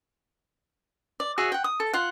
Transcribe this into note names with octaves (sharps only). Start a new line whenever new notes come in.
D5
F#4 G#4 C#5 E5
F#5 G5
D#6
A4
F4 F#5